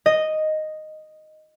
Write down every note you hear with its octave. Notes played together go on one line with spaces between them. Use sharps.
D#5